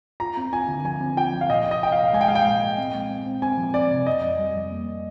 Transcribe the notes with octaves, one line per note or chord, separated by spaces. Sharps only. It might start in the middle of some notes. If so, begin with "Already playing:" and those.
F4 A#5
C4
F4 G#5
D3
F3 G#5
C4
F4 G5
F3
F5
A#2 D#5
C2
D#5
C2 G5
F5
C2
G#3 G#5
G5
G#3 F5
G5
A#2
A#2
C4
G#3
C4
C4
C4 G#5
F3
C4 D5
C3
F2 D#5
F2
G3
F2
A#3